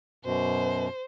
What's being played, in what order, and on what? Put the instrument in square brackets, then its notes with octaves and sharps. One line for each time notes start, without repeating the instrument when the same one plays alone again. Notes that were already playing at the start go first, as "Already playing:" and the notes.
[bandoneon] F#2 B2 [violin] C5